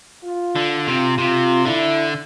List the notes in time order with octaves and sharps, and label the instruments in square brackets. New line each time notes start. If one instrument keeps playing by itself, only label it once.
[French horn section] F4
[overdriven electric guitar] D3
[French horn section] F4
[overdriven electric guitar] C3
[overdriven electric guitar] C3 [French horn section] F4
[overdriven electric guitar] D3 [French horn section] E4